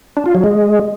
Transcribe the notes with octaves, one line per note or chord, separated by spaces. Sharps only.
D4
F4
F#3
G#3